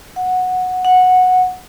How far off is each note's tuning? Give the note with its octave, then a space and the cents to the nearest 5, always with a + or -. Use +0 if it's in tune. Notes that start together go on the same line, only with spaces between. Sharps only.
F#5 -10
F#5 -10